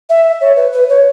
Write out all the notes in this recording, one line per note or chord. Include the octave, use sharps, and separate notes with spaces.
E5
C#5
B4
B4
C#5